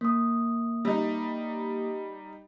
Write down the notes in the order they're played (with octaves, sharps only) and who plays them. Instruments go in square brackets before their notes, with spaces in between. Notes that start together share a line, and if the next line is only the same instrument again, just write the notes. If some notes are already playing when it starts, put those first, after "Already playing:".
[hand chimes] A#3 D#6
[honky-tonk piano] G3 D#4